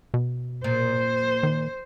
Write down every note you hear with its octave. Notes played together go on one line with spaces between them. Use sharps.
B2
A#2 C5
D#3